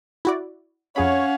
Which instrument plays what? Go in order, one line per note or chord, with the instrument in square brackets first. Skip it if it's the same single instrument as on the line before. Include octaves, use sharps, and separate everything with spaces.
[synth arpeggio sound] E4 F#4 D5
[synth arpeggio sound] F2 G#4 B5 [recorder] C#4 [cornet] C#5 [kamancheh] F5 F#5